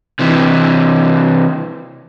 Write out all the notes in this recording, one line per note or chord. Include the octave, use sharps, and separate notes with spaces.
C3 E3